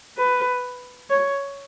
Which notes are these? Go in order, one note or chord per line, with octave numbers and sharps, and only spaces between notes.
B4
C#5